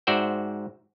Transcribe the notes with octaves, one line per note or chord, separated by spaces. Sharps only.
G#2 F#4 C5 D5 E5 G5